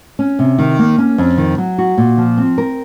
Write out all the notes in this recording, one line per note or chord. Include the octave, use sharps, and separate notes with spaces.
C#4
C3
D#3
A#3
C#4
F2
D#3
F#3
F#4
A#2
F3
C4
A#4